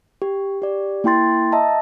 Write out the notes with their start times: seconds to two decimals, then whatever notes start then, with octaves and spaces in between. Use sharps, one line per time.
0.22 G4
0.62 G4 D5
1.04 A#3 E4 G5 C6 A6
1.52 D#5 E5 A5 A#5